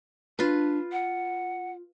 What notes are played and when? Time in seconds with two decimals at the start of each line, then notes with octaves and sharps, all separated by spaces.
0.39 D4 F4 B4
0.92 F#5